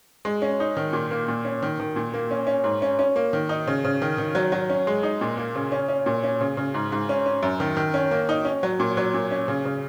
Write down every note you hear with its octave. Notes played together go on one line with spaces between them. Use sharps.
G#3
C#4
D#4
D#3
A#2
A#3
A#2
C#4
D#3
D#3
A#2
A#3
C#4
C#4
G#2
C#4
C#4
A#3
D#3
D#4
C#3
C#3
D#3
D#3
F#3
F#3
C#4
G#3
D#4
A#2
A#3
C#3
C#4
C#4
A#2
C#4
C#3
C#3
G#2
G#2
C#4
C#4
F#2
D#3
D#3
C#4
A#3
D#4
C#4
F#3
A#2
F#3
A#2
C#4
C#3
C#3